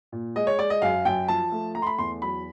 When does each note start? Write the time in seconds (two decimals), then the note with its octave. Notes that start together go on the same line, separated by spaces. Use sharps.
0.12 A#2
0.36 G#3 D#5
0.47 C#5
0.59 G#3 D5
0.70 D#5
0.82 F#2 F5
1.05 F#2 G5
1.28 F3 A5
1.52 A3
1.75 A3 A#5
1.82 C6
1.87 B5
1.98 E2 C6
2.22 F#3 B5